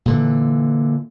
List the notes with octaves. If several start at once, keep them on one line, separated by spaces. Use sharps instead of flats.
A#2 D3 E3